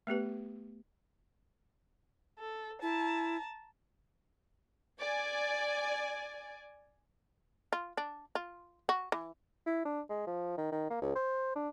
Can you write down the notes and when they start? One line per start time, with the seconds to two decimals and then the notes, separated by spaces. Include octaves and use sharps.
0.07 A3 B3 G4 B4
2.38 A4
2.82 E4 A5 A#5
4.99 D5 G#5
7.73 F4
7.97 D4
8.35 F4
8.89 F#4
9.12 E3
9.67 E4
9.85 D4
10.10 G#3
10.27 F3
10.58 D#3
10.72 D#3
10.90 A#3
11.02 C#2
11.16 C5
11.56 D4